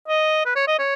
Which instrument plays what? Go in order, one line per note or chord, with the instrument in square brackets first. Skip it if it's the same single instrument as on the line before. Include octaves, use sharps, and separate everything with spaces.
[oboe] D#5
B4
C#5
D#5
C#5